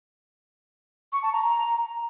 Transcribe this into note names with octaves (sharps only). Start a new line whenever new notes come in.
C#6
A5
A#5